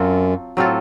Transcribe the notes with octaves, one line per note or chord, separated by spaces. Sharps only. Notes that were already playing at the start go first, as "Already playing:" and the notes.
Already playing: F#2 F#3 C4 F4 A4
A2 F#3 C4 F4 A4